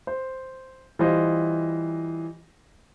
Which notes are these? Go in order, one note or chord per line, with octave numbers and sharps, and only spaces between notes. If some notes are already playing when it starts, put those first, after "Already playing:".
C5
E3 G3 F4 C5 D#5